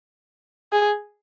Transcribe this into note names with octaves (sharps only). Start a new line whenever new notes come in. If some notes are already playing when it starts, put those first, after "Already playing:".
G#4